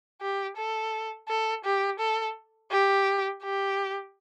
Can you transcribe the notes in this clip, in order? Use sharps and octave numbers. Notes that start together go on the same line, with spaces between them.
G4
A4
A4
G4
A4
G4
G4